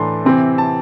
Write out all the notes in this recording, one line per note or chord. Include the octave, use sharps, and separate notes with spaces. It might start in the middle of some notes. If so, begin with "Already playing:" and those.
Already playing: A2 E3 A3 D4 A5 C6
C3 E3 C4 E4
A5